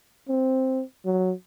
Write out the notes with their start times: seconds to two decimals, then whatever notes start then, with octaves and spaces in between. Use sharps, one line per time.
0.29 C4
1.05 F#3